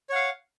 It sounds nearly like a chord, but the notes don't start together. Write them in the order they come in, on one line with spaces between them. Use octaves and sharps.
C#5 F#5 F5